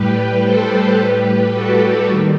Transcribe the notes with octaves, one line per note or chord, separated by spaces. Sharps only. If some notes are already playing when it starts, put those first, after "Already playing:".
Already playing: A2 G3 G4 B4
A4 C5
A2 G3 G4 B4
F#4 A4
D#2 D#3 G3